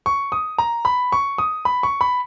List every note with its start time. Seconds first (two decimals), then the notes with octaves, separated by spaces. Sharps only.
0.06 C#6
0.32 D#6
0.58 A#5
0.85 B5
1.12 C#6
1.38 D#6
1.65 B5
1.83 C#6
2.01 B5